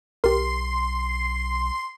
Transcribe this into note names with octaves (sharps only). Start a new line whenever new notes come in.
B1 G4 A#4 C6